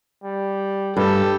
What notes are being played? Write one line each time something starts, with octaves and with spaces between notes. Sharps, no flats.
G3
G2 G4 A4